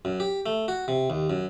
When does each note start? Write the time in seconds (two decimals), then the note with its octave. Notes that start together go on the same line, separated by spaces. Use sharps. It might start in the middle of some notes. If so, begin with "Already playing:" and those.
0.05 F#2
0.20 G4
0.46 A3
0.68 F#4
0.88 C3
1.10 D#2
1.30 F#2